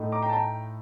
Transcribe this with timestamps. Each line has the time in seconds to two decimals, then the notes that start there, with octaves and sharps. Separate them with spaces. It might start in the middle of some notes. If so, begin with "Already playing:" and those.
Already playing: A2 A3 D#4
0.12 A#5 D6
0.22 G5 A#5
0.29 A5
0.33 G5 A#5